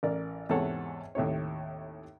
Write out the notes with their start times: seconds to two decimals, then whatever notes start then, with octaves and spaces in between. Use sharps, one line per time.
0.03 A1 A#4 D5
0.49 E2 G#2 C3 A4 C#5 F#5
1.15 D#2 A2 C3 C#5